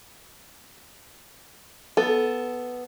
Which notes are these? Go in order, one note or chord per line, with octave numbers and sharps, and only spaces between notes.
B3 A4